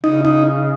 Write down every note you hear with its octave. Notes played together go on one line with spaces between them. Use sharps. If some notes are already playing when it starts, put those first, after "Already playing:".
C#3 D#4
D#4